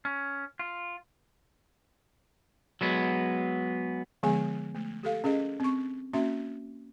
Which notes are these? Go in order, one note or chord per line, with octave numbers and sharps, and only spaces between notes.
C#4
F4
F#3 G#3 B3
D3 F3 G#3 B3 G#4 G#5
A3
G4 A4 F5
C#4 G#4 A#4 D#5
C4 C#6
A#3 C#4 F#4 E5 C6